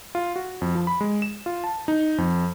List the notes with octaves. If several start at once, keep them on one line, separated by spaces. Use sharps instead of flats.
F4
F#4
F2
F3
B5
G#3
E7
F4
A5
D#4
F2